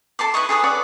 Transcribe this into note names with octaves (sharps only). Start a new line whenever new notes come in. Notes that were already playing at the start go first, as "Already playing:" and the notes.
A4 A5 C6 D6
E4 B4 D#5 C#6
G#4 A4 B4 D#6
B4 C#5 D5 F#5